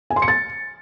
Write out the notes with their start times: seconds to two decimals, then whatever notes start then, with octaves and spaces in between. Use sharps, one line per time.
0.10 G#5
0.16 C6
0.22 C#7
0.28 A6